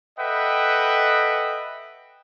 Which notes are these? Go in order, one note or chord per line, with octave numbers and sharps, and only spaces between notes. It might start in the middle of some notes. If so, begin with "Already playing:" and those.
A4 B4 D#5 E5 F#5 G5